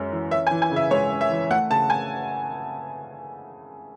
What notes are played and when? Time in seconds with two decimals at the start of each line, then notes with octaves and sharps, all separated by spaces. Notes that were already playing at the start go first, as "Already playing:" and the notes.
Already playing: F#2 G#3 C#4
0.12 E3
0.31 C#4 E5
0.47 G#5
0.51 E3
0.62 G#5
0.71 C#3 E5
0.91 G#3 C#5
1.11 C#4
1.21 E5
1.30 E3
1.50 A3 F#5
1.70 C#3 A5
1.90 G#5